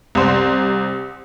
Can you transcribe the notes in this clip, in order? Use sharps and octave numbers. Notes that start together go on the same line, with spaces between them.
C2 C5